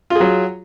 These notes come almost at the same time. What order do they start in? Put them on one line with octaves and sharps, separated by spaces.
F4 G#4 F#3